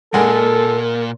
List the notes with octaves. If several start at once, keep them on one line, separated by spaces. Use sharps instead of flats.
A#2 G#3 A4 A#4 F#5 G#5